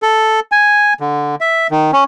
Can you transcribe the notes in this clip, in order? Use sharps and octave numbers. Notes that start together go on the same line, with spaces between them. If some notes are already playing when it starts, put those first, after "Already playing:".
A4
G#5
D3
E5
D#3
C#4